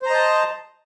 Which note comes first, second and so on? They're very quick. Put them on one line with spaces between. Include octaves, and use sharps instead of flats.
C5 A#5 D#5 A5